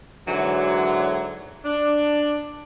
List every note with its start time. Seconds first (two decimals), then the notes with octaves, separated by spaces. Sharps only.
0.27 G#2 D3 E3 F#3
1.64 D4